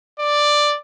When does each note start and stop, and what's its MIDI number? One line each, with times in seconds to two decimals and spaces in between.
0.19 0.76 74